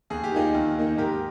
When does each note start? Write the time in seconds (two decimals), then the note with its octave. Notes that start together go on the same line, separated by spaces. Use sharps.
0.10 D#2 G#4
0.24 G4
0.32 D#3 A#3 D#4 F4 G#4
0.54 D#2
0.76 D#3 A#3 D#4
0.98 G#2 G4 A#4